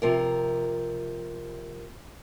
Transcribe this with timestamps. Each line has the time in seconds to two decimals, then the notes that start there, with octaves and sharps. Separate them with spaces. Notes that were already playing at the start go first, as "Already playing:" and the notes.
0.02 C3 F3 A#4